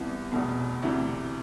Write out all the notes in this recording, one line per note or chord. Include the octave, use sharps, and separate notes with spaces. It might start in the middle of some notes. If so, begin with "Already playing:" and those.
Already playing: C2 C3 E3 B3
F1 E2 B2
D2 C3 E3